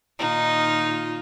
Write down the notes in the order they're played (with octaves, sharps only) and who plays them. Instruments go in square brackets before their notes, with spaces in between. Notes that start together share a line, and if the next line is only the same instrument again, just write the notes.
[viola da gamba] A#2 D#3 F4 [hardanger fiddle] D#4